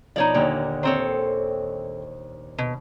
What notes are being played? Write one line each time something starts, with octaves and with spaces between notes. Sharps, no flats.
B2 F3 D#4 C#5 D5
D#2 A#2 D3
D#3 C4 A4 C5 C#5
B2